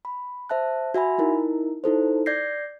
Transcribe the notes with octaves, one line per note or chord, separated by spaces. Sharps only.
B5
C5 E5 A5 F#6
F#4 E5 G#5 B5
D#4 E4 A#4
D#4 E4 A4 C5
D5 G6 G#6 A#6 C7